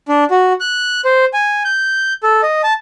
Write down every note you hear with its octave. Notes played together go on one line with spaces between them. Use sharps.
D4
F#4
F#6
C5
G#5
G6
A4
D#5
A5